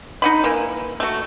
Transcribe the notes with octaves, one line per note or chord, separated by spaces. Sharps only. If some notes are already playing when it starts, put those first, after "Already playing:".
D#4 F#5 B5
E3 A#3
A3 F#4